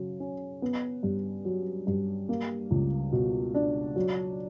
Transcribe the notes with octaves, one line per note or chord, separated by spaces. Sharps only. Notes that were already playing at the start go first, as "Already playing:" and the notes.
Already playing: C#3 F#3
C#4
B3
G2
F#3
G2
A#3
C#2
B2
D4
F#3